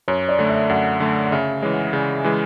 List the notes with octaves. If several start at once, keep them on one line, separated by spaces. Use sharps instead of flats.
F#2 C#5
D5
D3 A3
E5
F#2 F#5
D3 A3
F#5
C#3 E5
E3 G#3 C#5
F#5
E5
C#3 D5
E5
E3 G#3